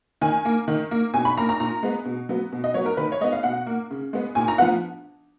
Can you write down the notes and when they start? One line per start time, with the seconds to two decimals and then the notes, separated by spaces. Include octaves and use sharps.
0.21 D#3 G#5
0.45 A#3
0.68 D#3
0.91 A#3
1.14 B2 G#5
1.25 B5
1.37 A#3 A#5
1.49 A#5
1.60 A#2 A#5
1.83 G#3 B3
2.05 B2
2.29 F#3 B3
2.52 B2
2.64 D#5
2.74 F#3 B3 C#5
2.86 A#4
2.97 D#3 B4
3.12 C#5
3.21 G#3 B3 D#5
3.33 F5
3.43 B2 F#5
3.67 A#3
3.90 C#3
4.13 G#3 B3
4.35 A#2 G#5
4.48 A#5
4.58 F3 B3 F#5